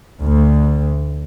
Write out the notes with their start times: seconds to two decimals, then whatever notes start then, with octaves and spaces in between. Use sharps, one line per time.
0.22 D2